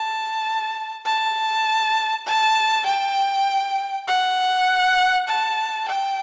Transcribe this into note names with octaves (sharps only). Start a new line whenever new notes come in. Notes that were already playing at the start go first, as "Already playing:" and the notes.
Already playing: A5
A5
A5
G5
F#5
A5
G5